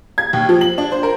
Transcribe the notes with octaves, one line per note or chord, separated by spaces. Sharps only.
G#6
D#2
F3
F#7
D4
C5
A#4